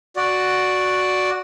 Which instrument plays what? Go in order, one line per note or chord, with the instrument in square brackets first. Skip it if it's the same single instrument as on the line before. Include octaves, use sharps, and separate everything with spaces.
[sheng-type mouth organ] F#4 D5